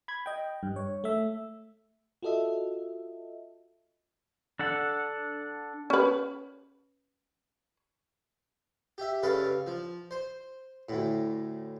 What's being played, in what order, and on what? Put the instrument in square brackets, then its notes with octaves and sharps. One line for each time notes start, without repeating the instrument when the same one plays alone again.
[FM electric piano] B5 G#6
D#5 G5
G2
C#5
A3 E5
F4 F#4 A4 D#5 E5
[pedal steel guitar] D4 A4 F#5
[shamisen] C#4 B4
[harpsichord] G4 E5
G2 C#3 A4 B4 F5
F3
C5
D2 A2